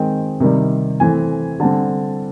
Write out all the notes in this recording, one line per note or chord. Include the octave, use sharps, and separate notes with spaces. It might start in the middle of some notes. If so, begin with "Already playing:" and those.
Already playing: D#3 G#3 C4 G5
C3 D#3 G3
E3 A3 C4 G#5
D3 G3 C4 A5